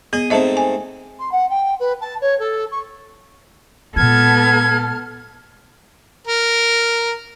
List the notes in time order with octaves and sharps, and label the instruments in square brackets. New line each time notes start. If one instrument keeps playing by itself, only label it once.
[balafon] B3 [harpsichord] G#4 D#5
[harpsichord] G#2 A3 C4 [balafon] D#5 E5 A5
[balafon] G#5
[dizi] C6
F#5
G5
B4
A5
C#5
A4
C#6
[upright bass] A#2 G#3 [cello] B3 A4 [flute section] A5 F6 [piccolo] G#6
[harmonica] A#4